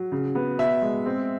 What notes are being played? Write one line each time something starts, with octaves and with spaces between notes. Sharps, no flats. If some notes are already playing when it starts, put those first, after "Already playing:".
Already playing: F#3
C#3
B3
B2 E5
G#3
C4